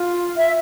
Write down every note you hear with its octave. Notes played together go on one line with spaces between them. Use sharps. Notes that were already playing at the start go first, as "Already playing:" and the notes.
Already playing: F4
E5